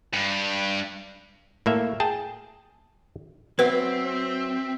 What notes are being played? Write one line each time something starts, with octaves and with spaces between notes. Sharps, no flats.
G2
A2 A#3 E5
G#4 G5 A5
F#3 B3 C4 F#4 B4 E5